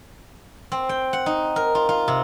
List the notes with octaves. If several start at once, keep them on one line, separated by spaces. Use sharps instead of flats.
C4
G5
F#5
D#4
A#4
F4
F4
C3